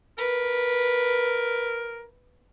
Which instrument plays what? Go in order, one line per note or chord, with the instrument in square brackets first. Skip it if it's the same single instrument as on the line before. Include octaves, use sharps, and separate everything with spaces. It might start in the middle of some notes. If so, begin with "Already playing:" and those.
[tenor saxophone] A#4 [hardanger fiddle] B4